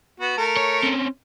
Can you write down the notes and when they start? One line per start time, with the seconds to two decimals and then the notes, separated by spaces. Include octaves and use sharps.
0.20 B3 F#4
0.37 A3 A#4
0.57 C#5
0.83 C4 C#4